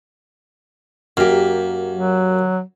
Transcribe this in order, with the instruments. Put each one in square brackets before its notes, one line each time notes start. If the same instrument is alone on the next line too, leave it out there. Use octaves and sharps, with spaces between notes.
[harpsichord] F#2 [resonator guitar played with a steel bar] A#3 G4
[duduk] F#3